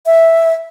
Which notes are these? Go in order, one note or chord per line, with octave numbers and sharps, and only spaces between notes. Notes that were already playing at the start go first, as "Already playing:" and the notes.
E5